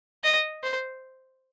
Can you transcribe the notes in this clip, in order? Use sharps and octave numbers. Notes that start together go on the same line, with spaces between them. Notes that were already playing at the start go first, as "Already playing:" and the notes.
D#5
C5